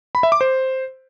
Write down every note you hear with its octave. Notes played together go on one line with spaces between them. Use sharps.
B5
E5
D6
C5